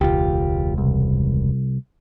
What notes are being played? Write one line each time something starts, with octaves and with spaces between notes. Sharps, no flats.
E1 C#2 F4 G4
C2